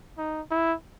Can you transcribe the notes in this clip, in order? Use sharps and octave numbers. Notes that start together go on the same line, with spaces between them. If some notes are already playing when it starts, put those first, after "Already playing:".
D#4
E4